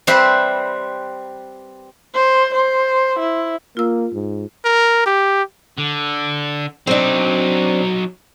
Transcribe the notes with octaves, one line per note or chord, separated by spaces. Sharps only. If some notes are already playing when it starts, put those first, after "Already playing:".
G3 C4 B4 C5 E5
C5
C5
E4
A#3 F4 E6
G#2
A#4
G4
D3
F#3 C4 D4 D#4